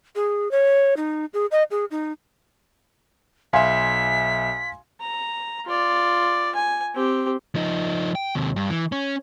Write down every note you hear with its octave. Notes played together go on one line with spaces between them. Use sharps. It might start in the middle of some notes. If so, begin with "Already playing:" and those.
G#4
C#5
D#4
G#4
D#5
G#4
D#4
B1 E5 F5 G#5 C6 B6
A#5
F4 D5
G#5
C4 G4
F3 D#4
G5
D#2 C3
G2
E3
C#4